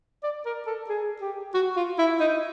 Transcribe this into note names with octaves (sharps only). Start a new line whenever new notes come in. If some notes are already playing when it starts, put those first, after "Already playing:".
D5
A#4
A4
G#4
G4
F#4
F4
E4
D#4